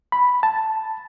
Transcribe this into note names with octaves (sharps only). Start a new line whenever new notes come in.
B5
A5